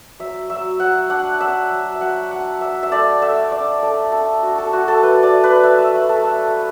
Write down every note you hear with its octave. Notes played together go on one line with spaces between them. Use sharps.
F#3 E5
F#3 E5
F#3 F#5
D4 F#5
D4 E5
F#3
E5
F#3 F#5
D4 F#5
D4 E5
E5
A3 D5
A3 E5
D4 D5
D4 A4
D4 A4
D4 F#4
A4
A3 F#4
A4
A3 B4
D5
A3
B4
A3 E5
E5
F#3 B4
A4
A3 E5
A3